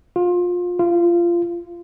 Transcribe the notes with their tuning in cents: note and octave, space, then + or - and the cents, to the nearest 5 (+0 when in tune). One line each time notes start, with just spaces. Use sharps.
F4 +25
F4 -20